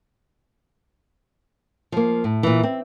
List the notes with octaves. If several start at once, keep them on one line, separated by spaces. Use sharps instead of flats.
F3 A#3
A2
A#2 E3
C4